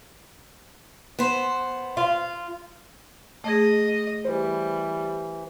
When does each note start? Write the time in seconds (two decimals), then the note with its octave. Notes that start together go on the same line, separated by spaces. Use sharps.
1.19 B3 C5
1.97 F4
3.44 A3 G#4 D#5
4.25 E3 G3 G4 C5